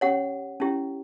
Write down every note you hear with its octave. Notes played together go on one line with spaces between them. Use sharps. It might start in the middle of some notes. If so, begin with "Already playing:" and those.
C#4 G4 C#5 F#5
C#4 E4 G4